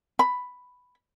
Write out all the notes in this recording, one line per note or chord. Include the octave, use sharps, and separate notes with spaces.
B5